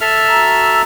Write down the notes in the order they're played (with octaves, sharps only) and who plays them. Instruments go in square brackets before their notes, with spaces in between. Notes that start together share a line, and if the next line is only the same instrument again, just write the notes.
[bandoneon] A4 E5 F6
[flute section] F#4 A#5 E6